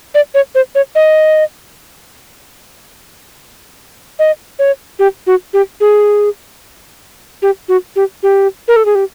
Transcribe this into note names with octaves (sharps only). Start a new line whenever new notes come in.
D5
C#5
C5
C#5
D#5
D#5
C#5
G4
F#4
G4
G#4
G4
F#4
G4
G4
A#4
A4
G#4
G4